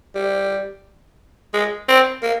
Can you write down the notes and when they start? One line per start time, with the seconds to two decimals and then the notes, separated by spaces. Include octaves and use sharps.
0.15 G3
1.54 G#3
1.88 C4
2.23 A#3